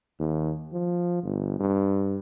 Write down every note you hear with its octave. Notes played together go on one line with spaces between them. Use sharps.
D#2
F3
G1
G2